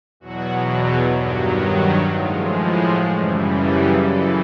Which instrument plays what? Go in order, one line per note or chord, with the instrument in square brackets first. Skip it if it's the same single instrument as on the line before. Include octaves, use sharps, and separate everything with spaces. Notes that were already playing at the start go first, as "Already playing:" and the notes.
[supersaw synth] E2 B2 F#3 F#4
G2 D#3 F#3 G4
F#4
A2 F3 G#3 F4
F#4
F#2 C#3 E3 G3
A4
F#2 C#3 E3 A4